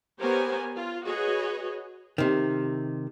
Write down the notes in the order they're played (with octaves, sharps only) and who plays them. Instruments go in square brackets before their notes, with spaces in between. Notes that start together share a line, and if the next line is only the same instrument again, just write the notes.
[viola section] B3 G4 A#4 C5 C#5 G#5
F4
F#4 G#4 B4 C#5 D#5
[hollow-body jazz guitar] C3 D#3